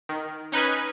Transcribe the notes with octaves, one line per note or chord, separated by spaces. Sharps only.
D#3
C#4 D#4 B4 G#5